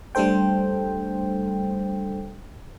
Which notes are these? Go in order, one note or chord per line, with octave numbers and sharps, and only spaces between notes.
G3 A3 D4 A4 C5 G5